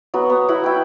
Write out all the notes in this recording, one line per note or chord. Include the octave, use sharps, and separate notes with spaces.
F#3 B3 F#4
B3
F#3 E4 F#4 B5
E4 G5